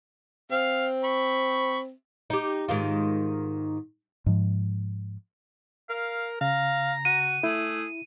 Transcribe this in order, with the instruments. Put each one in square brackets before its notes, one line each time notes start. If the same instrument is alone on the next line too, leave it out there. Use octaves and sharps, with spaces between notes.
[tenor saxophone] C4 [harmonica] F5
[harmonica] B5 C#6
[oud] D#4 G4
G#2 D#3 F4
[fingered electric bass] G#2 F3
[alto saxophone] A#4 [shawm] F5
[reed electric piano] C#3 [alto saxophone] F5 [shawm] A#5
[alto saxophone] F#4 [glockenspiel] D#7
[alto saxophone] A3 [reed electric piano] E4 [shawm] G#4